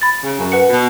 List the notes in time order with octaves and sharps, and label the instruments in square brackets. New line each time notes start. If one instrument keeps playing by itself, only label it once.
[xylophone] B5 A6
[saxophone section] C#3
F#2
[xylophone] B4 F#5 C#7
[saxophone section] B2